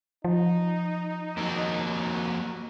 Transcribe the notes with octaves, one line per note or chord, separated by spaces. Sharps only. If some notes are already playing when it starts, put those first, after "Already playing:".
F3 D#4
F2 F#3 A#3 D#5